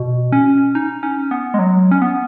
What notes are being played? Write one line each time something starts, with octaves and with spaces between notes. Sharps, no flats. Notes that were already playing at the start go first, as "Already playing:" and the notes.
Already playing: B2
C#4
D#4
C#4
B3
G#3
F#3
C#4
B3